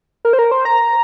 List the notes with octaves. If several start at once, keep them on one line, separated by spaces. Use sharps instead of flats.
A#4
C5
A#4
C5
A#5